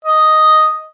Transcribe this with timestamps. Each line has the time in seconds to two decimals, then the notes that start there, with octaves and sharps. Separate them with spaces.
0.05 D#5